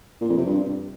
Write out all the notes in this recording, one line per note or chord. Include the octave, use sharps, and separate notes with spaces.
A#2
F2
C3
G2